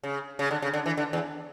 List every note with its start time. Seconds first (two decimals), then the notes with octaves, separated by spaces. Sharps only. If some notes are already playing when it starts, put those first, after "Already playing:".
0.04 C#3
0.39 C#3
0.51 D3
0.62 C#3
0.74 D3
0.86 E3
0.98 D3
1.13 E2